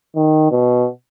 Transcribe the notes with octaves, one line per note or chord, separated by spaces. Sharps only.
D#3
B2